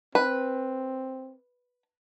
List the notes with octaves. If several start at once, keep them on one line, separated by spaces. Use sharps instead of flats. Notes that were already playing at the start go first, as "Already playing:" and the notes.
C4 B4